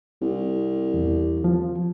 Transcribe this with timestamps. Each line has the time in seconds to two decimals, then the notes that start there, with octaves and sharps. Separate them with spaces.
0.22 C2
0.94 E2
1.44 F3